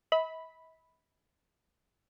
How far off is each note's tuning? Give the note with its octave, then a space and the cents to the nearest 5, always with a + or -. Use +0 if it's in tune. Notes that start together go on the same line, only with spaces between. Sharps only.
E5 -45 B5 +0